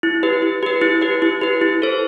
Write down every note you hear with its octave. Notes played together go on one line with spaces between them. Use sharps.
E4
G4 B4
E4
G4 B4
E4
G4 B4
E4
G4 B4
E4
A4 C5